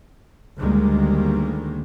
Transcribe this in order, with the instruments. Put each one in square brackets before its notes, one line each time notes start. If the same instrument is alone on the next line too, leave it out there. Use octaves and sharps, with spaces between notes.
[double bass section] D2 D#3 G3 G#3 A#3